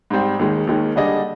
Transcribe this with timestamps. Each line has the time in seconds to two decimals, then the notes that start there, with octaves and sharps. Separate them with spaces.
0.10 G#2 G3 C4
0.39 D#2 D#3 G#3
0.67 D#2 D#3 G#3
0.96 D3 G3 D4 G#4 D#5